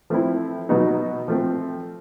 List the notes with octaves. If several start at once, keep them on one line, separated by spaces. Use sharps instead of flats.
F3 A3 C4 E4
B2 F#3 B3 D#4 F#4
F3 A3 C4